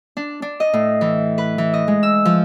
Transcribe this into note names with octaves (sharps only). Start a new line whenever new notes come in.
D4
D4
D#5
A2
E3
B4
E3
D#5
G#3
E6
F3